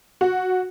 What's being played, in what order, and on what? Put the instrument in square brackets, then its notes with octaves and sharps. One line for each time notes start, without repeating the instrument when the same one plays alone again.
[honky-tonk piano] F#4